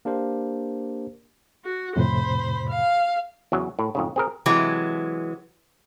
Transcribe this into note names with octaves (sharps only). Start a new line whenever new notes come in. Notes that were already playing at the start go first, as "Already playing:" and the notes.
A#3 D4 G4 A#4 C5
F#4
F2 A2 C3 C5 B5
F5
E2 C#3 F#3
A2
F2 G#2 C#3
C4 G#4 A#4
C3 E3 F#3 G#3